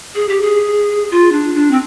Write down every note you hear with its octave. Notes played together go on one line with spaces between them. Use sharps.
G#4
G4
G#4
F4
D4
D4
C4